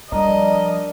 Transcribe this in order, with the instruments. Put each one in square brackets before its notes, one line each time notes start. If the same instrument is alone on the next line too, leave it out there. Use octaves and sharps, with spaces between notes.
[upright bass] F3 G3 [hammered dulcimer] D4 A#4 [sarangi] D#5 [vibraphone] A#5